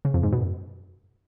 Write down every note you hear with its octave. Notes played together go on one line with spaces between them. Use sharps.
C#3
F2
G#2
B2
F#2